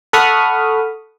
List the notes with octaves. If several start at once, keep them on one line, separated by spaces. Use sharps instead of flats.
A4 F#5 B5 C#6 D#6 F6